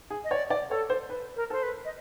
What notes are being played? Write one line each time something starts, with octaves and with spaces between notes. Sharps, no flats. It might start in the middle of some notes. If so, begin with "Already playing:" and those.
G#4
D#5
C#5 D5
D5
A4 C#5
C5
B4
A#4
A4 C5
B4
D#5